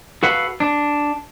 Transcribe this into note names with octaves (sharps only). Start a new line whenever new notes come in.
F#4 A4 B4 F5 F#5
D4